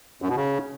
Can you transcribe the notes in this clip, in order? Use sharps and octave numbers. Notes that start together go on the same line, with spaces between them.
F#2
B2
C#3